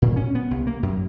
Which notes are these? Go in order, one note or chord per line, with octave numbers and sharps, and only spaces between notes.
A#2
C#4
B3
C2
A#3
F#2